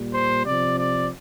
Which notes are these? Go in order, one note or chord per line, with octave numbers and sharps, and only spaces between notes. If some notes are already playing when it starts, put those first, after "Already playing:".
Already playing: A#2 G3
C5
C3 F3 D5
D5